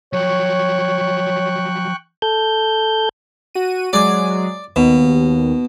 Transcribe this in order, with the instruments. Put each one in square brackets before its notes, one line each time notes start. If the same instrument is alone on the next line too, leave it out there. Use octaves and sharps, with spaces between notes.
[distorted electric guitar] F3 F#3 [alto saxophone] C#5 [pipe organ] G5 C#6 F#6
[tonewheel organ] A4 G6
[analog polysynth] F#4 D#7
[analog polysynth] F#3 G#3 G#4 [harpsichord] D5 D6
[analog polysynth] D#2 [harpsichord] B2